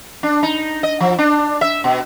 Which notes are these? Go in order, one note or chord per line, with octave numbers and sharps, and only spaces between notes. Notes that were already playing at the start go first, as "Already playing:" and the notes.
D4
D#4
D#5
F3
D4
E5
B2